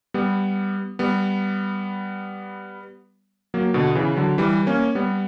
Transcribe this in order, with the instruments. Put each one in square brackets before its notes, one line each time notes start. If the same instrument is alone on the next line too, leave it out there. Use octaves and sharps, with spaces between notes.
[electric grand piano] G3 B3
G3 B3
F#3 A#3
B2 D3
C#3 E3
D3 F#3
E3 G3
A#3 C#4
G3 B3